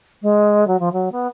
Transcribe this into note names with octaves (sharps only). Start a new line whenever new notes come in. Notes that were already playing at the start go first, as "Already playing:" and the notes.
G#3
F#3
F3
F#3
B3